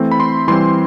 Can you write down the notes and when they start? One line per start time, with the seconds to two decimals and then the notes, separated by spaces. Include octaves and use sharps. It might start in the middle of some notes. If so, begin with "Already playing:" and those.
Already playing: E3 A3 C4
0.11 B5
0.20 C6
0.48 E3 G3 C4 C6